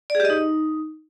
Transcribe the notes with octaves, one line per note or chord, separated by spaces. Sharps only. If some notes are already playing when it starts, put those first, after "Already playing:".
D5
G#4
G4
D#5
D#4